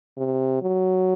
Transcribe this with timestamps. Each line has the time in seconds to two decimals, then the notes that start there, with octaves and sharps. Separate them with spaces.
0.18 C3
0.62 F#3